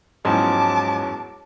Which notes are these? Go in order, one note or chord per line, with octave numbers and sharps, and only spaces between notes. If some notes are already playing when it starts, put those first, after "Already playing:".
E2 G#2 F3 F#3 C#4 A5 D6